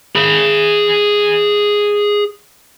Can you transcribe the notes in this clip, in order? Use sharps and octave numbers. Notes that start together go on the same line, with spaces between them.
G#4 B5